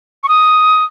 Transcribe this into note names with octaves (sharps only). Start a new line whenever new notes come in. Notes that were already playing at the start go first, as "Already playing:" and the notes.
C#6
D#6